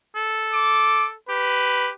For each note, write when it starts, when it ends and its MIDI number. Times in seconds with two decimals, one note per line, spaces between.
0.15 1.13 69
0.53 1.06 86
1.29 1.90 67
1.29 1.91 71